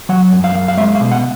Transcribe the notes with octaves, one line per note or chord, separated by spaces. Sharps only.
F#3 F#5
F#2
F5
F#2
F5
G#3 E5
F5
B2
F#5